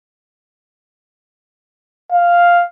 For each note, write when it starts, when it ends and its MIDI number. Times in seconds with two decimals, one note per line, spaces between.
2.12 2.64 77